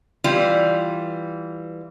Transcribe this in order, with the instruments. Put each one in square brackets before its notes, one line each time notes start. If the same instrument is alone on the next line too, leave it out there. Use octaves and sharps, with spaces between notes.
[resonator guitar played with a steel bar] E3 G3 F4